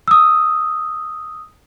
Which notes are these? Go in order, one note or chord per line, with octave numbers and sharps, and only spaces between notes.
D#6 E6